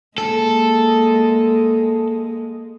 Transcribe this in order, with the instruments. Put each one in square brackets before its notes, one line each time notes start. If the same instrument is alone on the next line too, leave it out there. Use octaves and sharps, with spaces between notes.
[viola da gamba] G#3 A#3 [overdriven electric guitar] A4